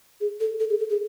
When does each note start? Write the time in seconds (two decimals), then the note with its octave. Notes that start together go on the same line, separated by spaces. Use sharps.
0.21 G#4
0.40 A4
0.60 A4
0.70 G#4
0.80 A4
0.90 G#4